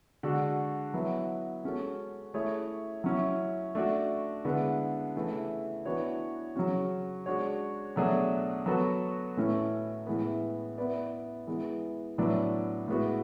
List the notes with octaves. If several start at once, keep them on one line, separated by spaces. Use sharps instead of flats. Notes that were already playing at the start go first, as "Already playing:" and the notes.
D3 G#3 D4 F#4
F#3 B3 E4
G#3 C#4 F#4 A4
A3 E4 G#4 C#5
F#3 C#4 E4
A3 D4 F#4
D3 G#3 B3 E4
C#3 E3 A3 E4
E3 B3 D4 F#4 C#5
C#3 F#3 C#4 F#4
G#3 D4 F#4 C#5
B2 F#3 A3 D4 G#4
F#3 B3 F#4 A4
A2 E3 A3 C#4
A2 E3 G#3 B3
B3 E4 B4 D5
E3 G#3 B3
A2 F#3 B3 D4
A2 G#3 B3 F#4